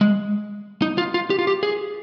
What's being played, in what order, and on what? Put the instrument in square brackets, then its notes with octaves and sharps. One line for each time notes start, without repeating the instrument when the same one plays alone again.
[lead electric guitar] G#3
D#4
F4
F4
G4
F4
G4
G#4